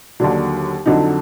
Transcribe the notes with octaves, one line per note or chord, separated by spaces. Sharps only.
D#2 D3 F#3 D4
F2 D3 F#3 D#4